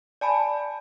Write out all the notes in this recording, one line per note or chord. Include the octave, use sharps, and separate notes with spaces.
D5 G#5 A5 B5